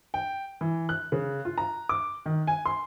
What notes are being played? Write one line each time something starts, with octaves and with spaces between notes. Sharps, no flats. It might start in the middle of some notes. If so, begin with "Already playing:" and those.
G5
E3
F#6
C#3
F4
A#5
D6
D#3
G#5
C6